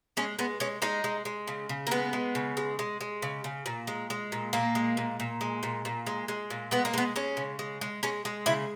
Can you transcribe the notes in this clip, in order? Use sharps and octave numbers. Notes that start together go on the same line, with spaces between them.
G#3 C#4
G#3 B3
G#3 C#4
G#3 D#4
G#3
G#3
C#3
C#3
A#3
G#3 B3
G#3
C#3
G#3
G#3
G#3
C#3
C#3
A#2
G#3
G#3
A#2
A#2 A#3
G#3
A#2
A#2
G#3
A#2
A#2
G#3
G#3
A#2
G#3 B3
A#3
G#3 B3
G#3 C#4
C#3
G#3
G#3
G#3 C#4
G#3
C#3 E4